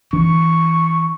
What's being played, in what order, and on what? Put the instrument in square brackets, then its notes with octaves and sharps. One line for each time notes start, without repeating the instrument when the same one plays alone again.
[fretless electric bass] E3 D4 [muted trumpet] C#6